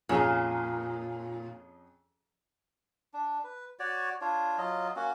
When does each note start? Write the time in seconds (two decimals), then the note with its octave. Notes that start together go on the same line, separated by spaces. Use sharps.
0.09 F2 A#2 C#4 G#4
3.14 D4
3.44 B4
3.79 F#4 C#5 D5
4.21 D4 F4 C#5
4.58 F#3 F4 D#5
4.96 A#3 C#4 F#4